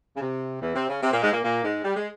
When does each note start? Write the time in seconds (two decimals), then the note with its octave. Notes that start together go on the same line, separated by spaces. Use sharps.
0.16 C#3
0.21 C3
0.61 E2 E3
0.75 C3 C4
0.89 C#3 C#4
1.02 C3 C4
1.12 A#2 A#3
1.22 G#2 G#3
1.32 A#2 A#3
1.43 A#2 A#3
1.64 G#2 G#3
1.84 G3
1.96 G#3